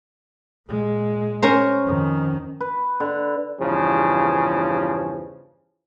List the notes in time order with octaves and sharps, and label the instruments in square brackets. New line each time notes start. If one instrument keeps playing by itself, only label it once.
[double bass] A#2 G#3
[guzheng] C#4 A#4 C5
[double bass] F2 D#3
[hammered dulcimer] B4
D3
[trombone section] E2 G2 C#3 F3